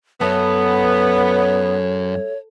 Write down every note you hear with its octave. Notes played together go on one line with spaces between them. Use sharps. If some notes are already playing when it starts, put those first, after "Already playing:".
F#2 A3 B3 C#5